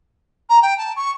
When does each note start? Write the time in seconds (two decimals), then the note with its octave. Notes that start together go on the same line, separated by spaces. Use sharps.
0.49 A#5
0.62 G5
0.78 A5
0.96 C#6